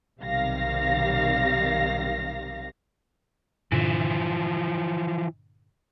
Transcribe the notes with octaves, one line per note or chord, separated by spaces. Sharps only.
B1 C3 D#3 G3 F5 A#6
G2 A#2 D3 E3 F3